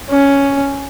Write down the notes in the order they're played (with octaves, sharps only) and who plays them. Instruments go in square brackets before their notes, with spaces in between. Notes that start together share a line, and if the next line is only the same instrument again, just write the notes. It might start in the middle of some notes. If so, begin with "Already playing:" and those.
[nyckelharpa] C#4